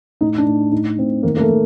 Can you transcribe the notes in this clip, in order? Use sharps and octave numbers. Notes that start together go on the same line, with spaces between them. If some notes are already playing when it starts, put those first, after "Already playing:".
A2 D#4
D4
A2
A2 D#4
A2 C4
D#3 A#3
A#3
A3
D#3